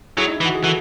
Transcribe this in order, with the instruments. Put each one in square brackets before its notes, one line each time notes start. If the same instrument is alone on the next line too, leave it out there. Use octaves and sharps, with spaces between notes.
[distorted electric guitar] F#3 [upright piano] E4 G#4
[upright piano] D#4
E4
[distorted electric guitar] E3
[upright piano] F#4
G#4
[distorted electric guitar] E3 [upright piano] F#4 A4